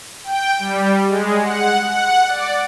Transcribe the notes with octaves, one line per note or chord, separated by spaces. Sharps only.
G5
G3
G#3
F#5
F#5
D5